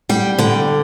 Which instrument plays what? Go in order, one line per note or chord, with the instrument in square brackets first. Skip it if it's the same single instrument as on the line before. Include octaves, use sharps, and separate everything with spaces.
[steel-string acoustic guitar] G3 G5
D3 G5